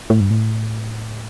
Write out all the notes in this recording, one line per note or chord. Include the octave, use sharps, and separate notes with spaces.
A2
G2
A2